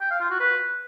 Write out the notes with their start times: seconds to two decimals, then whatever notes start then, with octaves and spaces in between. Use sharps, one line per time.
0.01 G5
0.11 F5
0.20 F4
0.30 F#4
0.40 B4